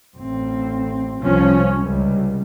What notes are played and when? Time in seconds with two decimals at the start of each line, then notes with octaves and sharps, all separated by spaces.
0.17 A1 C4
1.22 C2 F3 C#4
1.79 C#2 C3 G3